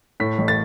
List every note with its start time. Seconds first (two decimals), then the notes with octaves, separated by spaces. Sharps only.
0.20 A2 B6
0.38 A1
0.48 A6